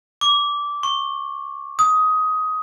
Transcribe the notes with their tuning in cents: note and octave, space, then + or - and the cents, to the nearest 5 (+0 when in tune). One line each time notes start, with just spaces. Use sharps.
D6 -15
C#6 -20
D#6 +15